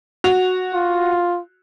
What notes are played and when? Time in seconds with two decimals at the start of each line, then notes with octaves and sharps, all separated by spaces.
0.24 F#4 F7
0.74 F4